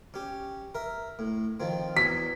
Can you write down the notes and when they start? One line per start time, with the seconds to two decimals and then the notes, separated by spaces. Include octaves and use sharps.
0.14 C#4 G4
0.75 A#4 E5
1.19 A2
1.60 D#3 F3 C4
1.97 E2 F#3 B6